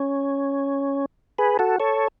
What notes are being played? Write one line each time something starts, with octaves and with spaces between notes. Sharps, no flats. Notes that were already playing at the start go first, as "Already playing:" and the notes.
Already playing: C#4
G#4 B4
F#4 A4
A4 C#5